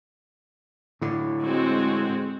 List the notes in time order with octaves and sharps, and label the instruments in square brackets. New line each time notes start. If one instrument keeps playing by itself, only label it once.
[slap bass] A2 D3
[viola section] G#3 C4 F#4